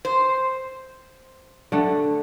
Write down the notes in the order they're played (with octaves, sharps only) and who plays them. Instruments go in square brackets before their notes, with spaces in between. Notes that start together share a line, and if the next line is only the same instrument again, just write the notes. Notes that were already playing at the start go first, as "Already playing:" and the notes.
[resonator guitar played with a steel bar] C5
[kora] D3 A3 F#5